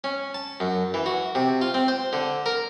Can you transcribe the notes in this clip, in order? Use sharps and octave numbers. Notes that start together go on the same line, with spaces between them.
C#4
A5
F#2
E3
F#4
C3
F4
C4
C5
D3
A#4